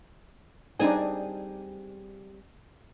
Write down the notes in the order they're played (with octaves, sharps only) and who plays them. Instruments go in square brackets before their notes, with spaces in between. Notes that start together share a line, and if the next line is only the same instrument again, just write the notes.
[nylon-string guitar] G3 C4 G#4 [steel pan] D4 D#4 G#5